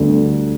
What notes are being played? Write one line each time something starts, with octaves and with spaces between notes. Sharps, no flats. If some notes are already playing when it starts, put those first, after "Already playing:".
Already playing: D2 D3 G3 B3